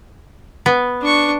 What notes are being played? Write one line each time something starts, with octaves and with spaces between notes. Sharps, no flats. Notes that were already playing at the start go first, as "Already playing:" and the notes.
B3
D4 C#6